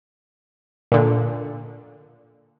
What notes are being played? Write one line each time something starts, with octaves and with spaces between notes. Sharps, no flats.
A#2 D3